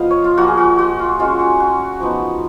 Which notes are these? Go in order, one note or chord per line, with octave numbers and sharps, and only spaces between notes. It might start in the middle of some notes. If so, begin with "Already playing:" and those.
Already playing: F3 B3 D#5 F5
C#5
F4
F3 A#3 F4 F#4
G#4
F#4
F#4
F4
G#3 C#4 F4 F#4
F#4
F#4
F3 B3 D#4